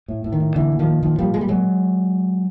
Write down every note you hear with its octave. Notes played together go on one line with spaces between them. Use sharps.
A2
A2
D#3
A2
A#2 D3 E3
A#2
D#3 F3
A#2
A#2 D#3 F3
A#2 F3 G3
A#2 G#3
G3
A#2 F#3 G#3